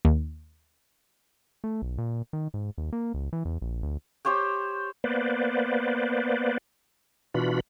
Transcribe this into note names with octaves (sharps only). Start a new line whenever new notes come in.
D#2
A3
B1
A#2
D#3
G#2
D#2
A#3
C#2
E3
E2
A#1
D2
G4 C5 C#5 G5
A#3 B3 B4 C5 D5
B2 E3 D4 F4 F#4 B5